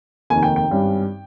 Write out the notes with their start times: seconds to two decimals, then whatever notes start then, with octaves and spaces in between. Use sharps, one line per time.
0.30 F1 D#2 D#3 G#5
0.43 G5
0.56 G5
0.69 G#1 G2 G3 C#4